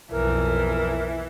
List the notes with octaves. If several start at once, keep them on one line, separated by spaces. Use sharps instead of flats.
B1 F2 E3 A#4